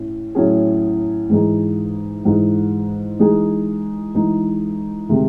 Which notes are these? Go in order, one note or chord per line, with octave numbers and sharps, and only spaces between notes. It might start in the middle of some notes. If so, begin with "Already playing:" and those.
Already playing: A2 C#4
A2 F#3 C#4 G#4
G#2 E3 G#3 D#4 G#4
G#2 E3 G#3 D#4 G#4
E3 G#3 D#4 G#4
E3 G#3 D#4 G#4
C3 D#3 G#3